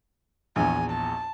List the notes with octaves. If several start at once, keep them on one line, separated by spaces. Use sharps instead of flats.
A#1 E2 G#5
A5